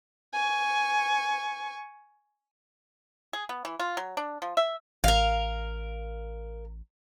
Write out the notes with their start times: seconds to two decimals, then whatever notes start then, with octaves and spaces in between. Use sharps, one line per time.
0.33 G#5 C#6
3.33 G#4
3.49 B3
3.65 E3
3.79 F4
3.97 F#3
4.17 D4
4.42 F3
4.57 E5
5.04 A1 A#4 F5